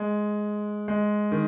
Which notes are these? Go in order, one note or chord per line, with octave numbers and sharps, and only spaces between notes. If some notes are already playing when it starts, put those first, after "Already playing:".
Already playing: G#3
G#3
D#3